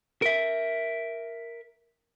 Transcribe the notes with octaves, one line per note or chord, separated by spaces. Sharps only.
A#4 E5